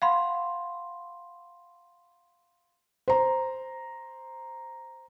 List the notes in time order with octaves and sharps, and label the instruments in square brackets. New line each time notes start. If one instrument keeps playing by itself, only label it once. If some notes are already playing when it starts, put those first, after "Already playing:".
[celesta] F5 F#5 B5 C6
[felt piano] C5 A#5